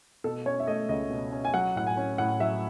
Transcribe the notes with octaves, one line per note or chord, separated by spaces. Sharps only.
B2 A4
C#4 C#5
E5
A3 D#5
C#2 D#5
B2
C#4
G#5
F#3 F#5
A2 F#5
G#5
C#4
A2 F#5
F#3 E5